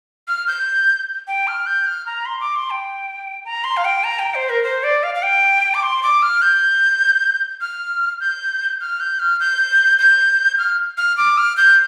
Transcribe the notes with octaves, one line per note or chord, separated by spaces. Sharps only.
F6
G6
G5
F6
G6
F6
A#5
C6
D6
C6
G5
A#5
C6
F5
G5
A#5
G5
C5
A#4
C5
D5
F5
F5
G5
D6
C6
D6
F6
G6
F6
G6
F6
G6
F6
G6
G6
F6
F6
D6
F6
G6